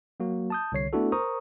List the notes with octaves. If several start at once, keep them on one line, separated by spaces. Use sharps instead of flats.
F#3 A#3 F#4
A5 D#6 G6
C2 D3 C#5 C7
A3 B3 D4 E4 F#4 A4
A#4 C5 A#5 C#6 D#6